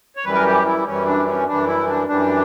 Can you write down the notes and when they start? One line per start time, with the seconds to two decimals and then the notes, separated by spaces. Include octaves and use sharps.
0.17 C#5
0.24 F#2 E3 G3 B4
0.35 A#4
0.45 G4
0.65 E4
0.86 F#2 E3 G3 C#4
1.06 D4
1.26 C#4
1.47 F#2 E3 G3 D4
1.67 E4
1.87 D4
2.07 F#2 E3 G3 D4